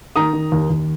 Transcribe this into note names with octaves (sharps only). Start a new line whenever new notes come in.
D#3 A#5 D#6
D#3
D#2
D#2